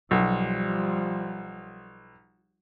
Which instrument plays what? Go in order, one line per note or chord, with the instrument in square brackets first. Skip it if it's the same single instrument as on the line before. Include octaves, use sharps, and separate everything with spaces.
[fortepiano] B1 [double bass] F3 G3